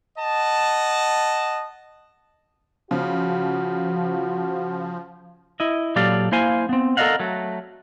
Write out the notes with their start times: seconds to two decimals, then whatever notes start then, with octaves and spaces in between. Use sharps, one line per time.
0.19 D#5 F#5 A5
2.91 C#3 F3 F4 F#4
5.60 E4 D#5
5.96 A#2 F#3 G4 A4 D5 F5
6.32 A#3 E4 C5 F5 G#5
6.69 B3 C4
6.97 A4 A#4 D5 D#5 F5 F#5
7.20 F#3 A3